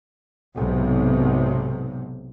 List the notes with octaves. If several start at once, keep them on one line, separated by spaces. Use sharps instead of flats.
B1 G#2 C3